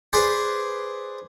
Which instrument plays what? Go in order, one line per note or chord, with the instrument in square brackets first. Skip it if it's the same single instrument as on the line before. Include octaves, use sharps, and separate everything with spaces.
[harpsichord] G#4 B4 C5 D5